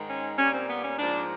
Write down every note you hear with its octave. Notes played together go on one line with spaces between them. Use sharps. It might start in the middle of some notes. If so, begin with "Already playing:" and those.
Already playing: G#2 D#3 G#3
C#4
A#2 G3 A#3 C#4
C4
B3
C#4
G#2 F3 A#3 D4